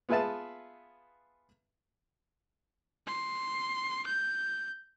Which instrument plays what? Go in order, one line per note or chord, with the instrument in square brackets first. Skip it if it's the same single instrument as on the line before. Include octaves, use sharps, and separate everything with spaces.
[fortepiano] B3 F4 G#4 B4 E5 A5
[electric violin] C6
G6